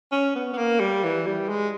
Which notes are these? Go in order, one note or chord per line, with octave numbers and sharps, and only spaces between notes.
C#4
B3
B3
A#3
G3
E3
G3
G#3